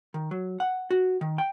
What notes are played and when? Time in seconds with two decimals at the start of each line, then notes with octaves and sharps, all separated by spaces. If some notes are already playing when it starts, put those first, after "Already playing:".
0.14 D#3
0.31 F#3
0.60 F#5
0.90 F#4
1.21 D#3
1.38 G5